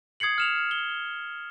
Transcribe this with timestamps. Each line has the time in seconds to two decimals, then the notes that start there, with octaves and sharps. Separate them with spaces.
0.20 D#6 G#6 C7 C#7 F#7
0.38 F6 E7 F7
0.71 G7